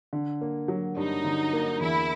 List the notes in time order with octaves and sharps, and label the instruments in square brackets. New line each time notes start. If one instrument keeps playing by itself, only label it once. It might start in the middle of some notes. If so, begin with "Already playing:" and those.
[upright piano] D3
A#3
F#3
[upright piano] G2 [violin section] D#4
[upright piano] D3
A#3
[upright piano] E2 [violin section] E4